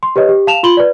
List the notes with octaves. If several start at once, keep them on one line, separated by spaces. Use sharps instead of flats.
C6
G4 B4 C#5 D#5
G4
F5 A5 E7 F7
F4 B5 C6 F#7 G7
B4 D5